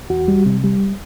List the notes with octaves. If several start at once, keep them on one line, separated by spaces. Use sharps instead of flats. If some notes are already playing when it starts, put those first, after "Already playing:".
E2 F#4
G3
C3
G3